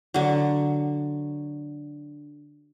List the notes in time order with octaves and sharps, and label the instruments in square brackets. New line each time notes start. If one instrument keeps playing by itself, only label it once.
[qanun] D3 F#3